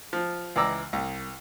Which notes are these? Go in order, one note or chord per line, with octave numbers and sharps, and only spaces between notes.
F3
C#2 E3 D5 A#5 E6
C2